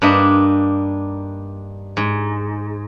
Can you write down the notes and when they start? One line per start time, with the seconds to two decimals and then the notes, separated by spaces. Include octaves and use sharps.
0.02 G2 A#3 D4 D#4 D#5 E5
1.97 G#2